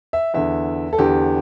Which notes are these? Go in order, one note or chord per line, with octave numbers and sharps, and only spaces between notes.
E5
E2 D3 E5
A4
E2 D3 G4